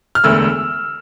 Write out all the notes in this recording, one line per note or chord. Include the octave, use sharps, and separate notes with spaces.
F6
E1 D2 D3 A3 E6